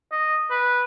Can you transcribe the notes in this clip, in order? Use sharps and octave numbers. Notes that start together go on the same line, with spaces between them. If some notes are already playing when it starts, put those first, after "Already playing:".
D#5
B4